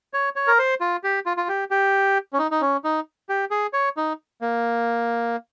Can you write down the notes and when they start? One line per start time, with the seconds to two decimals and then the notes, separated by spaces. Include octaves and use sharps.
0.14 C#5
0.36 C#5
0.47 A#4
0.59 C5
0.81 F4
1.04 G4
1.26 F4
1.37 F4
1.48 G4
1.71 G4
2.33 C#4
2.39 D#4
2.51 D#4
2.61 C#4
2.84 D#4
3.29 G4
3.51 G#4
3.73 C#5
3.97 D#4
4.42 A#3